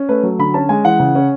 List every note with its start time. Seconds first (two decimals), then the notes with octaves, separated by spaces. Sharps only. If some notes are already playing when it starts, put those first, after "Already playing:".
Already playing: C#4
0.09 A3 B4
0.23 F#3
0.39 D3 B5
0.54 C#4 A5
0.69 G#3 G#5
0.85 E3 F#5
1.00 C#3
1.15 C#4